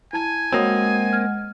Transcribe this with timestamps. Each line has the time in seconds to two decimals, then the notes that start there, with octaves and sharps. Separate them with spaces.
0.13 E4 G#5 A5 G#6
0.53 G#3 A#3 C4 F#4 C#5 D#5 F#5 D#6
1.13 F6 G#6